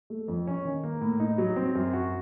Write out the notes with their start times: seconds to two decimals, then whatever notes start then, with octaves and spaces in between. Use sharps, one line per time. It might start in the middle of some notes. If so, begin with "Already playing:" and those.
0.10 A3
0.28 F2
0.47 C#4
0.65 D#3
0.84 A#3
1.01 A2
1.20 D#4
1.38 F#3
1.56 C4
1.75 F#2
1.93 F#4